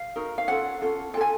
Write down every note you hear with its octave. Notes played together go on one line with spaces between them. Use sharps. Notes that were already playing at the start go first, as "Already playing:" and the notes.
Already playing: F5
D#4 F#4 A#4
F5
C#4 F4 A4 F#5
C#4 F4 A4
F4 A4 G5 G#5